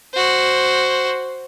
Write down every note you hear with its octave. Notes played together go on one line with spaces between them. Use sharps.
F#4 C5